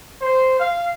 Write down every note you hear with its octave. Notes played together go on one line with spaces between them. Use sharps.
C5
F5